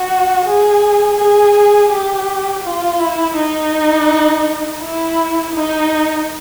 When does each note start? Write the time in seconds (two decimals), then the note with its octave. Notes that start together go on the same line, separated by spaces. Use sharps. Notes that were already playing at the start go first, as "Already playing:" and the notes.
Already playing: F#4
0.45 G#4
1.17 G#4
1.90 G4
2.64 F4
2.99 E4
3.37 D#4
4.82 E4
5.55 D#4